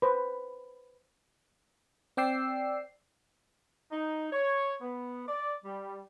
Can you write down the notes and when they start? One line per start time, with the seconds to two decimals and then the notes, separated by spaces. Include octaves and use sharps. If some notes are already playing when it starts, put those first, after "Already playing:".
0.02 B4 C5
2.17 C4 D5 G5 E6 C7
3.91 D#4
4.32 C#5
4.81 B3
5.28 D5
5.65 G3